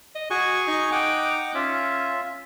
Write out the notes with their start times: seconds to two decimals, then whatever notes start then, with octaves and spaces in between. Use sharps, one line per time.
0.15 D#5
0.30 F#4 G#4 G#5 C#6
0.68 D#4
0.92 F#5 G5 D6
1.55 C#4 F4 E5